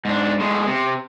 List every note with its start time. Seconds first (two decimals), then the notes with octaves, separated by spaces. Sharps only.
0.05 G#2 D4
0.39 A2 G#3
0.66 C3